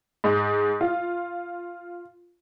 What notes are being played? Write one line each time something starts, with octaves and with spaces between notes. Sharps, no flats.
G#2
F4